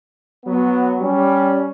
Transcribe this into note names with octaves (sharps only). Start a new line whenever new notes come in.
F#3 B3
G3 C#4